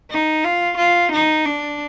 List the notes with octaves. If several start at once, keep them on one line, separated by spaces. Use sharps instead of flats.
D#4
F4
F4
D#4
D4